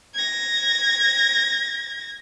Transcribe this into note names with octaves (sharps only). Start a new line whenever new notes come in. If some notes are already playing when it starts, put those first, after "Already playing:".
G#6 A#6